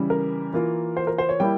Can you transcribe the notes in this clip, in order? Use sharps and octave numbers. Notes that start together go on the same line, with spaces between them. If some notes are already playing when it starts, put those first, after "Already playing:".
Already playing: C#3 E3 G3
A#4
E3 A#3 F4
C5
A#4
C5
C#5
G3 A#3 E4 G5